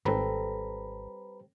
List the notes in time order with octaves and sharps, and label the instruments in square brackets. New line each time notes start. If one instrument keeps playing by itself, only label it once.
[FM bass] G#1 [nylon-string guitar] G3 C4 A4 [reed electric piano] B4 A#5 B5